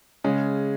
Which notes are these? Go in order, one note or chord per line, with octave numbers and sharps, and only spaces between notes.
C#3 G#3 C#4